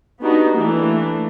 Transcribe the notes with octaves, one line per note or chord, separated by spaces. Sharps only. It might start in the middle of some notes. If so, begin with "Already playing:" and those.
B3 D4 D#4 F#4 G4
E3 A3 A#3 D4